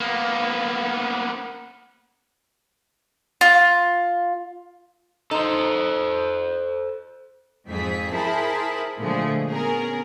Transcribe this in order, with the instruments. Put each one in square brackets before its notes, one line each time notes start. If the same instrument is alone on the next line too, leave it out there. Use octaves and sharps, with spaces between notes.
[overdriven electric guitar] A#3 B3
[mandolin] F4
[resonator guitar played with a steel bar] D#4 [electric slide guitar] A4 C5
[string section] F2 G#2 C4 G#4 B6
E4 G#4 A#4 C5 A5 B5
A#2 D3 F3 G#3 A3 G#4
B3 C#4 G#4 A#4